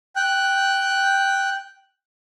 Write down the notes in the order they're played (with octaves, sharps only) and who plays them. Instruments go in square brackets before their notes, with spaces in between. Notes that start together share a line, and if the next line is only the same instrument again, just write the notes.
[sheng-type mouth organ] G5 F#6